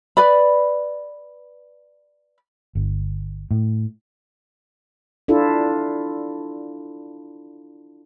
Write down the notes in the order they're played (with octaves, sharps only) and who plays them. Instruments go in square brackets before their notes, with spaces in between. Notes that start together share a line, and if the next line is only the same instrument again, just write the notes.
[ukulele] B4 D5 B5
[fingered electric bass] G1
A2
[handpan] D4 E4 F4 A4